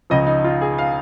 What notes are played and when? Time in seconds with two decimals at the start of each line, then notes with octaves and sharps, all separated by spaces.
0.10 C#2 C#3 F3 D#5
0.27 D#4
0.44 F4
0.61 G#4
0.78 F5